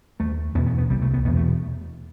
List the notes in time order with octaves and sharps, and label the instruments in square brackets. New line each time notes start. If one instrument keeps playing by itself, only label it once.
[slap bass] D#2 A3
E2 B2 B3
B3
B3
C2 C3 G3
A3
B3
E2 B2 B3
A3